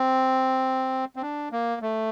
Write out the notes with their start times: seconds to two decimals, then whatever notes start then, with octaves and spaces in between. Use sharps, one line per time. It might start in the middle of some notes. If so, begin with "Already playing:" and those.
Already playing: C4
1.16 C4
1.22 D4
1.52 A#3
1.81 A3